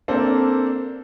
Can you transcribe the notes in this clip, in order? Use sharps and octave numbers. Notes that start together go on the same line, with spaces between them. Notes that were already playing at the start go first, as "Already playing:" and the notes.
A#3 C4 D4 A4 C5